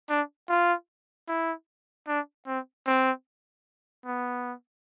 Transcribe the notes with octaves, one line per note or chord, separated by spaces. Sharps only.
D4
F4
E4
D4
C4
C4
B3